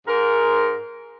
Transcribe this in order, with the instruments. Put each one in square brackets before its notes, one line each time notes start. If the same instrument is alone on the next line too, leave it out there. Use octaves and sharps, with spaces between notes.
[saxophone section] G#2 A#4